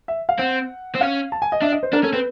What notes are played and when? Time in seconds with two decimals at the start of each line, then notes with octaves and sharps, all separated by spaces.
0.08 E5
0.29 F5
0.39 C4 F#5
0.95 C4
1.01 C#4 F5
1.32 A5
1.42 G#5
1.52 D#5
1.62 D4 E5
1.72 D#5
1.83 C5
1.93 D4 A#4
2.03 C#4 A4
2.13 C4 B4